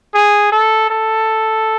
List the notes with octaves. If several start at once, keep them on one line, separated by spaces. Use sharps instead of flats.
G#4
A4
A4